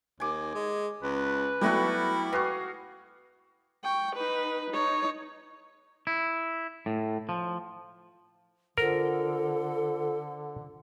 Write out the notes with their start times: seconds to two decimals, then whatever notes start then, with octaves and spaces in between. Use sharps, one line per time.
0.20 D#2 G#5 D6
0.54 G#3
1.03 C#2 B4
1.61 F#3 G3 A3 B3 E4 F#4 A4
2.32 F#4 G#4 B4 F5 C#6
3.84 G5 C#6
4.16 D#4 B4
4.71 D#4 C#5
6.07 E4
6.86 A2
7.29 F3
8.78 D3 F4 A4 A#4 C5 F#5